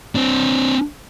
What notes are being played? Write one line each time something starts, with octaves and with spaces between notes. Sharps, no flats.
C4 D4